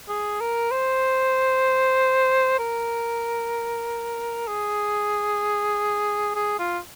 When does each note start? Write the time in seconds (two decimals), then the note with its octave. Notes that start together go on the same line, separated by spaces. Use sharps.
0.08 G#4
0.40 A#4
0.71 C5
2.59 A#4
4.47 G#4
6.35 G#4
6.59 F4